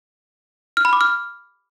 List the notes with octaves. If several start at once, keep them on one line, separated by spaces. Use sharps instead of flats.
F6
B5
D6
F6